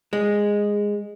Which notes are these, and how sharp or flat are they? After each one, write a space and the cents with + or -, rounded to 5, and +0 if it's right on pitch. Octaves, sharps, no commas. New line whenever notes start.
G#3 -10